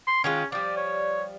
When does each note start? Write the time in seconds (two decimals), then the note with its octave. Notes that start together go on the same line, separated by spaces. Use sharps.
0.07 C6
0.24 D#3 G#3 C#4 F4
0.52 F3 G3 D5
0.77 C#5